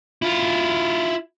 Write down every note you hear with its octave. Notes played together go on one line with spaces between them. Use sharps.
E4 F4